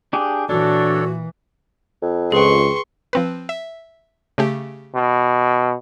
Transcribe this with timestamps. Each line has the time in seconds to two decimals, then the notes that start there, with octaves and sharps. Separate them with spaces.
0.13 D4 G4 G#4
0.49 A#2 E3 D4 F#4 A4 C#5 D5
2.02 F2
2.32 C#2 G#4 B4 G5 C6 C#6
3.13 F3 C4 B4
3.49 E5
4.38 C#3 A3 G4
4.95 B2